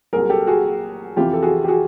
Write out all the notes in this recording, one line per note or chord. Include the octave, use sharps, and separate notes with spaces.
C2 A#2 F#3 G#4 A#4
G4 A4
F#4 G#4
F2 C3 E3 F4 G4
A4
F#4 G#4
G4
F#4 G#4